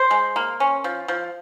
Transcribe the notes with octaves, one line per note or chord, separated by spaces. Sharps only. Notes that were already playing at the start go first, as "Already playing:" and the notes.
Already playing: C5
G#3
A#3
C#4
F3
F3